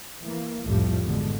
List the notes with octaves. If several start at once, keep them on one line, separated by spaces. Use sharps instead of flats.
E3 A#3
C2 F2 A2 F3 G3
G#1 B2 D3 G#3